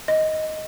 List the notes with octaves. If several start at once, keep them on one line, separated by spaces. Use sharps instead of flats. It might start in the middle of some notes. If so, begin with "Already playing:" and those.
D#5